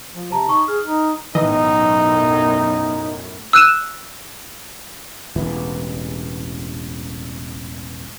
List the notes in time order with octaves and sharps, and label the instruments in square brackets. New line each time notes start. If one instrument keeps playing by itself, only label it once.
[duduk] F3
[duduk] C3 [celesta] A5 A#5
[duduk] D#4 [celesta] C#6
[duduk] G#4 [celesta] F6
[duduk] D#4
[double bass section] B1 F#2 A2 [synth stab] E3 D#5 [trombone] D#4
[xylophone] E6 F#6 D#7 E7
[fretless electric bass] E1 A1 E3